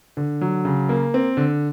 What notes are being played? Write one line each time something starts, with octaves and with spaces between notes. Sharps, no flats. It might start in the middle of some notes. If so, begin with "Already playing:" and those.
D3
F#3
C#3
A#3
C4
D3